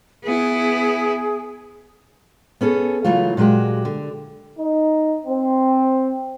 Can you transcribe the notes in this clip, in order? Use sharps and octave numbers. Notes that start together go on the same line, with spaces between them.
B3 E4 G#4
B3 C#4 G#4 A4
C#3 E3 F#3 A3 F4
A#2 F#3 G#3 F#4 G4
D3
D#4
C4